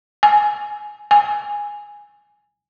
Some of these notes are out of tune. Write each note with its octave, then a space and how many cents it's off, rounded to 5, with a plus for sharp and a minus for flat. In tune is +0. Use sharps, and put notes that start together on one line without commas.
G#5 +10
G#5 -5